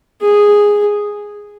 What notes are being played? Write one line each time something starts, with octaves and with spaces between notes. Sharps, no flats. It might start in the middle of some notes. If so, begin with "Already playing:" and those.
G#4